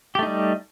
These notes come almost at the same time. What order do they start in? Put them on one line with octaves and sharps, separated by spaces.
G4 A3 D#4 G3